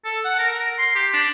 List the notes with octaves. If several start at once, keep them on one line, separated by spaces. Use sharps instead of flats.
A4
F#5
A#4
C6
G4
D4